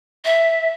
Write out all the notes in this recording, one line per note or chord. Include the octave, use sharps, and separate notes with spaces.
E5